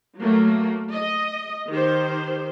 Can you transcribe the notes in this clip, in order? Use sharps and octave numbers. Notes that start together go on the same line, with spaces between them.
F#3 A3 A#3
D#5
D#3 G4 C5